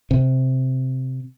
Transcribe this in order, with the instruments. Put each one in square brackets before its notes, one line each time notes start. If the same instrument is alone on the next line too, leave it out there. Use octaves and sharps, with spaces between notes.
[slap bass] C3